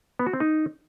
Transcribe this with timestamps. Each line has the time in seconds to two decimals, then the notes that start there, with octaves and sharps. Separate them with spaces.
0.19 B3
0.26 F#4
0.33 C4
0.40 D#4